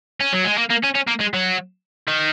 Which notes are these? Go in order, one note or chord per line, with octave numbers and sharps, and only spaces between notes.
C#4
F#3
G#3
A#3
A#3
C#4
C#4
A#3
G#3
F#3
D#3